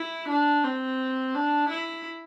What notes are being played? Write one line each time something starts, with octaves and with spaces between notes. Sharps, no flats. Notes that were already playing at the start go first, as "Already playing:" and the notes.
Already playing: E4
D4
C4
D4
E4